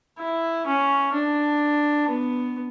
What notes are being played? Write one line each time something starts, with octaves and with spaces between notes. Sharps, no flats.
E4
C#4
D4
B3